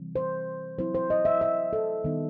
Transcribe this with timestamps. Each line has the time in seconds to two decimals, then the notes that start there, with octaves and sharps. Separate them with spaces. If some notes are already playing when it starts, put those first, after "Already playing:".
Already playing: C3 E3 G3 C4
0.16 C5
0.78 F#3 C4 E4 C5
0.95 C5
1.10 D#5
1.25 E5
1.41 E5
1.73 A4
2.04 D#3 G3 B3 D#4